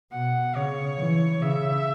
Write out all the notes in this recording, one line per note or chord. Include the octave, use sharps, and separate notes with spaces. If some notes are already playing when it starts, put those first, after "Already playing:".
B2 F#5
C#3 C#5
E3
C#3 E5